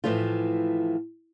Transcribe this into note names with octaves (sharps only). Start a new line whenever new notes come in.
A2 E3 F3 A3 F4